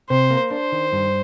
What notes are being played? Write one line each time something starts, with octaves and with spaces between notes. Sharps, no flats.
C3 C5
A#3
D4 C5
D#3
G2